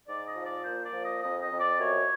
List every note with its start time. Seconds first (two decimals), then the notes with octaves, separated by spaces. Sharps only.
0.07 G#2 D5
0.26 D#5
0.35 F3
0.46 D5
0.64 A#2 C5
0.84 D5
0.93 F3
1.02 D#5
1.21 F2 D#5
1.40 D#5
1.50 F2
1.59 D5
1.79 F#2 C#5